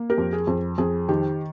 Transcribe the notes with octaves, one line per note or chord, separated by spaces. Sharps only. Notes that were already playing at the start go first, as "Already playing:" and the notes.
Already playing: A#3
G4 A#4
F2
G#4
F2
F2 G#4
D#3 G4